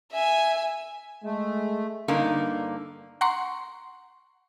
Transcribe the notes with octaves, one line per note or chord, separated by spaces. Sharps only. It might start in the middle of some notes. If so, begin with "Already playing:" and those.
E5 G#5
G#3 A3
G2 D3 A#3 D#4
F#5 A#5 C6 C#6